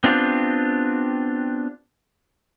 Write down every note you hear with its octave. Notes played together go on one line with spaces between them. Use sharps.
B3 C4 D4 F4 G4